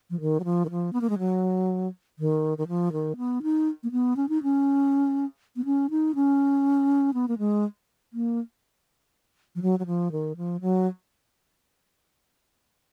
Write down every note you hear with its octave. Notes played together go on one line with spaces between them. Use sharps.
F3
D#3
F#3
F3
D#3
F3
B3
A#3
G#3
F#3
D#3
D#3
F3
D#3
B3
D#4
A#3
B3
C#4
D#4
C#4
B3
C#4
D#4
C#4
B3
A#3
G#3
A#3
F3
F#3
F#3
F3
D#3
F3
F#3